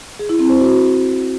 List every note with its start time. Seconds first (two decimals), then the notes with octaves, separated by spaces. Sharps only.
0.19 G#4
0.29 E4
0.39 C4
0.49 C5
0.59 F#4